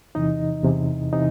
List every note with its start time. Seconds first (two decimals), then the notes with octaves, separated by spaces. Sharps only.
0.15 E2 C3 E3 D#4 D#5
0.64 E2 C3 E3
1.13 C3 E3 D#4 D#5